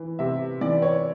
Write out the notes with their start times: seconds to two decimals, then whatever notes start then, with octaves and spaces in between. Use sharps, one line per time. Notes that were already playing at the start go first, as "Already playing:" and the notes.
Already playing: E3
0.19 C3 E5
0.61 E3 D5
0.82 C#5